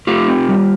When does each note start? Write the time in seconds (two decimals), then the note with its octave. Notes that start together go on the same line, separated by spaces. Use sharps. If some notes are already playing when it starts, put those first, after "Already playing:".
0.07 A3 F4 G4
0.28 C4
0.49 G3